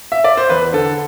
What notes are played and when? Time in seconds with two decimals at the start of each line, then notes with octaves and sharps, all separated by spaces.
0.12 E5
0.24 D5
0.37 C5
0.49 E2 B4
0.73 D3 A4